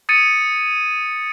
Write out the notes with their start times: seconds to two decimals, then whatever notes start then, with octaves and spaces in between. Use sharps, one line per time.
0.09 D#6 G#6 A6 C#7 D#7